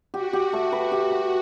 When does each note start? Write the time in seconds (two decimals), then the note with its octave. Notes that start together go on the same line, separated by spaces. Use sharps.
0.14 F#4 G4
0.33 G4
0.53 A3
0.72 B4
0.92 G4
1.12 B4